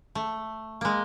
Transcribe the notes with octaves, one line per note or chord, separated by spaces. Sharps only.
A3
G#3 A#3